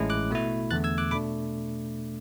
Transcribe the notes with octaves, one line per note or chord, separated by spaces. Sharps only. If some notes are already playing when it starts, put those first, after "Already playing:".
Already playing: A1 A2 G#3 C#4 E4
D6 F#6
B2 A3 E4
E2 D3 A3 F#6 A6
E6 G#6
D6 F#6
B2 A3 D4 B5 D6